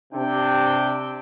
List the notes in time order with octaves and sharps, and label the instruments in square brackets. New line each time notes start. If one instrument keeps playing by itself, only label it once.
[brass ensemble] C3 D4 G5